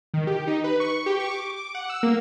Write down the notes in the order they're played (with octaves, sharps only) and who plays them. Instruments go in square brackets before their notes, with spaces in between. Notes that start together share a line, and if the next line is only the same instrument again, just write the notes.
[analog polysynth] D#3
G4
D#4
B4
C#6
G4
C#6
D6
D6
F#5
E6
A#3